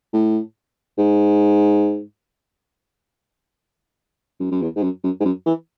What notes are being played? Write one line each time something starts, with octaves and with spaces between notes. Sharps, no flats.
A2
G#2
F#2
F#2
E2
G#2
F#2
F#2
G#2
F#2
E3